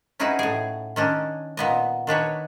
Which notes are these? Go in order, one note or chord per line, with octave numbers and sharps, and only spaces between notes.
C#4 D#4 E4 F#4 G#4 B4
A2 G#4
D#3 C#4 D4
A#2 B3 D#5
D#3 D4 B4 C#5